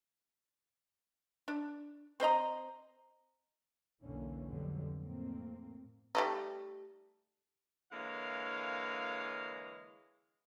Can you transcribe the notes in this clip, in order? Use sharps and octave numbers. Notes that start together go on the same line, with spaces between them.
D4
C4 C5 D#5 A#5
B1 E2 D3 E3 A#3 C#4
F2 G#2 B2 D3 F#3 G3
F2 A2 A#3 C4
G3 A3 D#4
D3 E3 G#3 A#3 C#5 F5